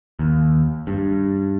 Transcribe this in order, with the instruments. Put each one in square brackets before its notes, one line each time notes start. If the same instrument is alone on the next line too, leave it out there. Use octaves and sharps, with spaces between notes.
[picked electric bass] D#2
G2